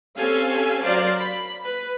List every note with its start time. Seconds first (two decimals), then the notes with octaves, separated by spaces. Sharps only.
0.17 C4 C#4 G4 A4 F5 G#5
0.83 F#3 A#4 C5 D5 F5
1.18 B5
1.64 B4